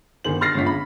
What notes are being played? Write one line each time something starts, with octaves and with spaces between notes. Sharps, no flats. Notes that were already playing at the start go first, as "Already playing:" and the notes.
G1 D#3 G#4 C5 F#7
C6 F6 A6 A#6 C7
G1 G#3 C#4 F4 C#5 B6
B5